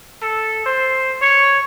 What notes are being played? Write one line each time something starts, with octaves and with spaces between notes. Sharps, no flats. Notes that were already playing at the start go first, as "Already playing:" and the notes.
A4
C5
C#5